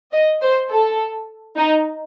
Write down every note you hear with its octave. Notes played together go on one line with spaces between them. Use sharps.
D#5
C5
A4
D#4